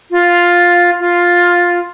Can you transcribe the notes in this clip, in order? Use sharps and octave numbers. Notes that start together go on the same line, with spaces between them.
F4
F4